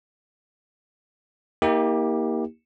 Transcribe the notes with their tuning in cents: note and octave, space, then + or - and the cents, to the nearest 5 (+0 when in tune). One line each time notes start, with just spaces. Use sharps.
A#3 +10 D#4 +45 G4 +10